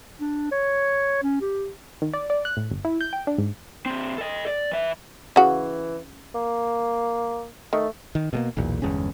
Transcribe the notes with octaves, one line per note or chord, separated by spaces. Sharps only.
D4
C#5
C#4
G4
D#3
D5
D5
F#6
A2
G1
E4
G6
G5
D4
G#2
D3 C4
A4 D#5
D5
E3 E5
C#3 E3 F#4
A#3
D#3 A3
D#3
B2 G#3 A#3
B1 E2 A#2
G1 E2 G#3 C#4